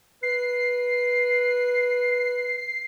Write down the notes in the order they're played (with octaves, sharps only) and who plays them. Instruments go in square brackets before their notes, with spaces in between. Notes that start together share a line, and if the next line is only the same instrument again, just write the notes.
[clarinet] B4 [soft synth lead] C7